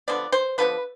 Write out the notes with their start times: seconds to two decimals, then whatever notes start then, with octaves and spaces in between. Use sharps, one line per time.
0.08 D3 F3 B3 D5
0.32 C5
0.58 D3 F3 B3 B4